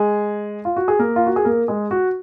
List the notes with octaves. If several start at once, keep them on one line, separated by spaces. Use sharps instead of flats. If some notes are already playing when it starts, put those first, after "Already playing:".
Already playing: G#3 G#4
F4
F#4
G#4
A#3 A#4
F4
F#4
G#4
A#3 A#4
G#3 G#4
F#4